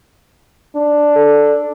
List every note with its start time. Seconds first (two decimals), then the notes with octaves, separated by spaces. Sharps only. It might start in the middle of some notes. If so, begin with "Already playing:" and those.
0.76 D4
1.15 A4